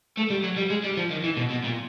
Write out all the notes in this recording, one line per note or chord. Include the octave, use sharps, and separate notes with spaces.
A3
G3
F#3
G3
G#3
G3
F3
D#3
E3
B2
B2
A#2